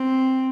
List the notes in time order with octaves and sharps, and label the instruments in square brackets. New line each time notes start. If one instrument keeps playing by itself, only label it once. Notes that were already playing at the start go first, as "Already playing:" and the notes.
Already playing: [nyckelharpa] C4